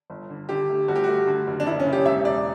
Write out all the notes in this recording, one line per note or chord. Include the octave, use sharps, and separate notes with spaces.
G1
D3
D3 G4
A3
G1 F#4
G4
A3 F#4
D3
F#1
D4
F#1 E4
C#4
C#3
G4
E1 E5
E1 D5